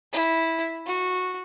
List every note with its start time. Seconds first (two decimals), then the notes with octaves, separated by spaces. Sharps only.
0.12 E4
0.86 F#4